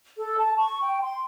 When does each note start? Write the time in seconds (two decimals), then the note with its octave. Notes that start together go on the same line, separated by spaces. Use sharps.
0.17 A4
0.37 A5
0.57 C#6
0.81 G5
1.01 C6